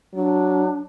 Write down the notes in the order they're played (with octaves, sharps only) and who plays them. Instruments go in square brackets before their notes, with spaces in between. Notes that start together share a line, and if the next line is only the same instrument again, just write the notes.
[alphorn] F#3 [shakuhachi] D4